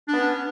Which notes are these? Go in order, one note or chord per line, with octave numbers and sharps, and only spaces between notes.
B3 C#4 D4